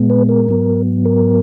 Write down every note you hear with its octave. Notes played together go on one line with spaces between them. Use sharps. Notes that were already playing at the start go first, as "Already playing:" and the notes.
Already playing: A#2 G#3 B3
B4
A#4
G#2 F#3 B3
A#4